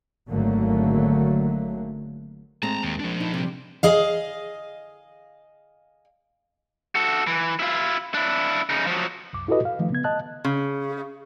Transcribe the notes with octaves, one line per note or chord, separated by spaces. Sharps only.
G#1 D3 F#3 A3 A#3
G#3 A3 C4 A5 A#5
D#2
F3 D4
D#4
C3 G3
G#4 D#5 F5
F#4 A4
E3
E4 F4
D4 E4
C#3 D#4
F3 F#3
C2 F#2 D6
E4 F#4 G4 A4 B4 D#5
F5
D#3 F3 A3
C#3 B3 G#6
D#5 A5 F#6
C#3